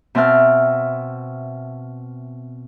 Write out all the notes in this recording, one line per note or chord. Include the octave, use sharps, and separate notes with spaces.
B2 C4 E5 A5 F6